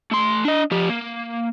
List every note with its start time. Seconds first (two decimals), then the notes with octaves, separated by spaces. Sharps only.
0.12 A3 C6
0.45 D4 D#5
0.71 F3 G4
0.89 A#3